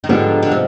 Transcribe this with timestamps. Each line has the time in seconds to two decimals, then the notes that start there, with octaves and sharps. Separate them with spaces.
0.04 D#3
0.09 G#2 D3 F3 B3 D#4 G4
0.42 D3
0.52 C3